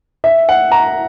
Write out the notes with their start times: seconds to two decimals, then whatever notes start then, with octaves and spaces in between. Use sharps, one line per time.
0.24 E5
0.49 F#5
0.72 A#5